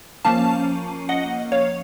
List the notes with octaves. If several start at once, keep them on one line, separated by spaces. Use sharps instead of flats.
F3 A#3 C#4 F5 A5
D#5 F#5
C#5 F5